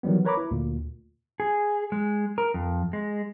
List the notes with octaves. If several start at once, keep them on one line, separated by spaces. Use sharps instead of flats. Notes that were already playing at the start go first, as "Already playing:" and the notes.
D#3 E3 F#3 G3 B3
A#4 B4 C#5 A#5 B5 D6
E4
D2 A#2
G#4
G#3
A#4
F2
G#3